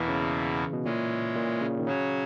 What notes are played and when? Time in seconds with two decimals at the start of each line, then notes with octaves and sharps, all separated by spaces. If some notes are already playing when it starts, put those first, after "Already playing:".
Already playing: E2 B2 E3 A#3 E4
0.08 C#3
0.73 B2
0.85 A#2 E3 G#3 C#4
1.36 A#2
1.61 C#3
1.79 D#3
1.86 C#3 F#3 C#4 F#4 C#5